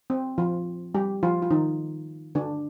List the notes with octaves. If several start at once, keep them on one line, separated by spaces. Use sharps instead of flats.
C4
F3 F4
G3 G4
F3 F4
F4
D#3 D#4
D3 D4